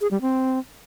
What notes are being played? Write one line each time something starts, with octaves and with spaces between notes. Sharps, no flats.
G#4
G3
C4